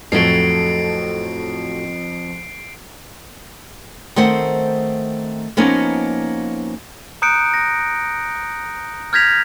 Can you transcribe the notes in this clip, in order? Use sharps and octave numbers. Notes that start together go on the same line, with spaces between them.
F2 A2 F#3 A3 C7 D7
D#3 A3 C4 C5 F#5
F3 A#3 B3 C#4 D#4
A#5 D#6 F#6 G6 C#7 D7
A#6
F6 G6 G#6 A#6 B6 F7